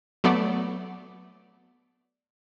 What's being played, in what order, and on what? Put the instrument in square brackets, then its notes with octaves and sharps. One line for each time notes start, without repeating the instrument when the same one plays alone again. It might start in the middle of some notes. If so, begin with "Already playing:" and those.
[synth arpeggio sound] F#3 A3 B3 D5